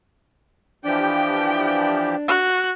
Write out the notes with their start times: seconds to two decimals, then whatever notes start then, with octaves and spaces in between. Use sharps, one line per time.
0.85 E3 F3 D4 G4 G5
2.27 F#4 F#6